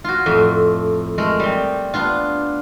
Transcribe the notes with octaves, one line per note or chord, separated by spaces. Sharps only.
F4 F#4
F2 A2
G#3 A3 A#4
G3 C4
B3 D4 F4